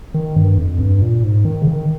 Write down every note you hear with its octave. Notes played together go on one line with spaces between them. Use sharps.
D#3
G2
F2
G2
A#2
G#2
D#3
C#3
D#3